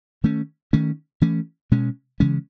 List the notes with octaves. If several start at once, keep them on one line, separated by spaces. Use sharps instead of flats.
D#3 A3 C#4
D#3 A3 C#4
E3 A3 C#4
B2 G#3 C#4
C#3 E3 G#3 C#4